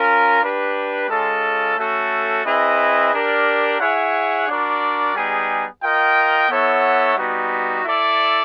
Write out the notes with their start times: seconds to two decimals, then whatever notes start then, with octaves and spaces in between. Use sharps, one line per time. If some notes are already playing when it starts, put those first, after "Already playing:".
Already playing: C#4 F4 A#4
0.42 D4 G4 B4
1.10 G#3 C#4 F4 A4
1.78 A3 C#4 F#4 A4
2.45 C4 E4 G#4 B4 D#5
3.12 D4 G4 A#4 D5
3.80 E4 G#4 C#5 F#5
4.47 D4 F#4 A#4 D5
5.15 G3 B3 D#4 G#4
5.83 F4 A#4 D#5 G5
6.49 B3 E4 A4 C#5 F#5
7.17 G3 B3 D#4 F#4
7.84 E4 A4 D5